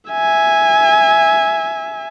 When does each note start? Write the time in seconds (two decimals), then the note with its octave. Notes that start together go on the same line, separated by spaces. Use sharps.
0.11 E5 G#5